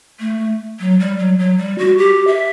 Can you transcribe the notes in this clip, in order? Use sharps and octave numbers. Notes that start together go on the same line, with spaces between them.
A3
F#3
G3
F#3
F#3
G3
F#4
G4
E5